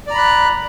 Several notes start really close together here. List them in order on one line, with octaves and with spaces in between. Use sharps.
D5 A#5 B5 F#6